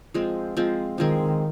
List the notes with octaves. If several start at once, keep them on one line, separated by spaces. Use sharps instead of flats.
F3 G#3 C4
F3 G#3 C4
D#3 F3 G#3 C4